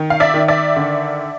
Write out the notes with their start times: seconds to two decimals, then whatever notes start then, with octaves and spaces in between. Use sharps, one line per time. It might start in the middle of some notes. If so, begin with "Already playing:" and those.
Already playing: D#3
0.10 F5
0.20 D5 E5
0.34 D#3
0.48 D5 E5
0.76 D3